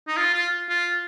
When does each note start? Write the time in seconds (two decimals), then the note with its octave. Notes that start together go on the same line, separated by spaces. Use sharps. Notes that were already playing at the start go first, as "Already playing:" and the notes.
0.08 D#4
0.17 F4
0.34 F4
0.69 F4